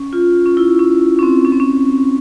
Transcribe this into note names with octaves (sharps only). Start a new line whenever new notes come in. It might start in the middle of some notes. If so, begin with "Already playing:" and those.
Already playing: C#4
F4
C#4
E4
C#4
C#4
C4
C#4
C4
C#4